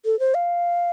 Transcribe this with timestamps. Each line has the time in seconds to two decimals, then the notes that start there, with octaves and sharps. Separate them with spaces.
0.05 A4
0.20 C5
0.35 F5